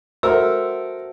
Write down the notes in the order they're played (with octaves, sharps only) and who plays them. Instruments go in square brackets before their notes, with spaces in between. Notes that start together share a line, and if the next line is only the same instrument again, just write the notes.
[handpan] F#4 C5 E5 [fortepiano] A4 A#4 [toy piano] E6